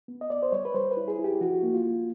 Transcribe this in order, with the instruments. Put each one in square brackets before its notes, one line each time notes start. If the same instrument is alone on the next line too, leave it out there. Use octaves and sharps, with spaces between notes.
[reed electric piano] B3
D#5
B3 D5
C5
G3 C#5
B4
G3 C5
B4
E4
G#4
E4
G4
F3 F#4
A#3
F4
A#3